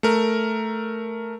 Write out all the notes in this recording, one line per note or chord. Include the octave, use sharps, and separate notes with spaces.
A3 A#4